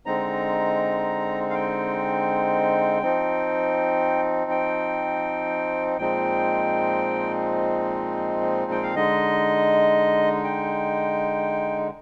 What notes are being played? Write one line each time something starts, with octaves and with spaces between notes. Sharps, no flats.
D3 G#3 C4 D#4 A#5
F5
G5
F3 C4 D#4
G5
A#2 F3 G#3 C4 D#4 G5
G5
F5
D3 G#3 D#4 D#5
G5